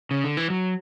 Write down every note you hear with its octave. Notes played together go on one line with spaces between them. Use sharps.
C#3
D3
E3
F#3